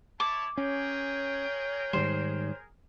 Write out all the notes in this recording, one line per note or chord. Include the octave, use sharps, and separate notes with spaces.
E4 C#5 A5 D6
C#4 G#4 A#4 C#5 G5
G#2 D#3 G3 C5